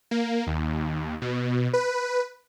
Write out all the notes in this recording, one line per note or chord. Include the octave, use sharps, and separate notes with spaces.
A#3
D#2
B2
B4